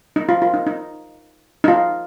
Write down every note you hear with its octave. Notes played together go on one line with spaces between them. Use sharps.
D#4
F4
F4
D#4
D#4
D#4
F4